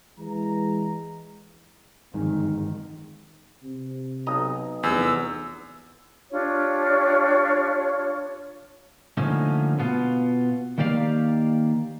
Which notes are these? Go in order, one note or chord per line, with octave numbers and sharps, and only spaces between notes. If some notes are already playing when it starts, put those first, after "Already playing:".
E3 G#3 A#5
G1 F2 G#2 D#3
C3
B1 D#5 A#5
F1 E2 E6
D4 F4 G4 C#5
D3 F3 A3 A#3 C#4 D#4
B2 B3 F4
D#3 A#3 G4 D5 F5